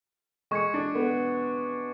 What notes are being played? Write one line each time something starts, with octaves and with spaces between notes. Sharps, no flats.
G#3 C#6 G#6 C#7
D4
B3